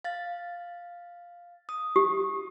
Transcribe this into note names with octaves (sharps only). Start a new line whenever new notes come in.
F5 A6
D#6
G4